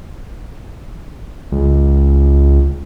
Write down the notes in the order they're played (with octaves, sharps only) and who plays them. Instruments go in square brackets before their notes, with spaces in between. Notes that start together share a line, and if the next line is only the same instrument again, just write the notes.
[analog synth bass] C#2